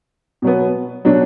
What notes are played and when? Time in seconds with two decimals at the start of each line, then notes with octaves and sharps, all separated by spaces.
0.42 B2 F#3 B3
1.05 B2 F#3 D4 F#4